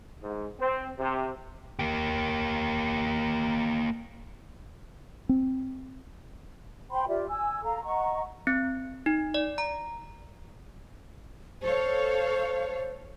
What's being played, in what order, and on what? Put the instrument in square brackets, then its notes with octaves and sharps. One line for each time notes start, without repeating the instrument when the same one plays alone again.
[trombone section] G#2
C4
C3
[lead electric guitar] A#3 G4
[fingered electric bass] C4
[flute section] C5 G5 B5 C6
F4 G4 D5 E5
G#5 E6
A4 F5 A#5
D#5 F#5 A#5 C#6
[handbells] C4
D#4
D5
A#5
[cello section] A4 C#5 F5 [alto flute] C5